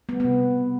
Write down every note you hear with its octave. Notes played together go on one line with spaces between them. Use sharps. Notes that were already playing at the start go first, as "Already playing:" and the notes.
G3 B3
B3
C3